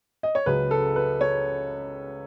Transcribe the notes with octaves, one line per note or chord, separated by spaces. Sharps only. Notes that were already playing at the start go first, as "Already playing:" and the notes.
D#5
C#5
C#2 C#3 F#3 B4
A4
B4
C#5